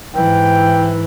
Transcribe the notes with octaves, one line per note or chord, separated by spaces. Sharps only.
G#2 E3 G5